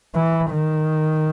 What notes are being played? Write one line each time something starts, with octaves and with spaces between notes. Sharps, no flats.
E3
D#3